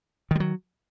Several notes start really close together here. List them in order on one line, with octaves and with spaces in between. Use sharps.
D#3 G3 F#3